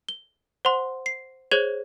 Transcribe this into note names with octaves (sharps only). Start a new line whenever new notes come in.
G7
C5 F#5 C6
C7
G#4 C5 C#5 G#6 F7 F#7